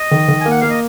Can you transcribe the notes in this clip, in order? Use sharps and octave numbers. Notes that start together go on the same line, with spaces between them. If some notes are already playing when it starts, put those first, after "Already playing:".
Already playing: D#5
D#3
D#3
G#5
A#3
F#5
A#3 F5
D#5